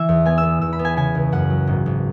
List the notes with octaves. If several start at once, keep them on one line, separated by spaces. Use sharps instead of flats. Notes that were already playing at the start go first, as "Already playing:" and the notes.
Already playing: E3 E5
E2
B3 G#5
E6
B3
E2 E6
B5
B3
G#5
C#3 G#5
C#2
F#2 F#5
F#3
G#1
G#1